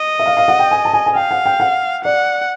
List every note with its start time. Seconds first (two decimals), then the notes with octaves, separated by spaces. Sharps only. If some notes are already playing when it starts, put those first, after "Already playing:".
Already playing: D#5
0.19 E5
0.26 F5
0.37 F5
0.48 F#5
0.59 G5
0.71 G#5
0.85 A5
0.93 G#5
1.06 G#5
1.15 F5 G5
1.31 F#5
1.46 G5
1.60 F#5
2.05 D5 F#5